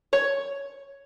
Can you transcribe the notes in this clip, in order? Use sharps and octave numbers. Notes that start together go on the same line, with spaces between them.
C#5